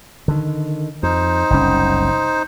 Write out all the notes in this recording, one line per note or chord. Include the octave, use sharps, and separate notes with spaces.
D3 D#3
F2 D#4 C5
F#1 C2 C#4